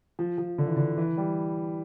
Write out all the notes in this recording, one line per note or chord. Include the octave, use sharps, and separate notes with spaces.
F3
F3
D3
E3
D3
E3
G3